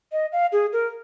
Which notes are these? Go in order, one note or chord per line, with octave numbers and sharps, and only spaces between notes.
D#5
F5
G#4
A#4